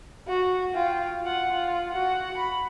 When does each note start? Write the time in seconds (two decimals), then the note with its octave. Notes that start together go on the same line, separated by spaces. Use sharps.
0.28 F#4
0.74 F4 G5
1.22 F4 F#5
1.51 F4
1.92 F#4 F#5
2.38 B5